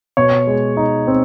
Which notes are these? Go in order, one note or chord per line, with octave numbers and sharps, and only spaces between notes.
B2 C#5
G#3
D#4
C4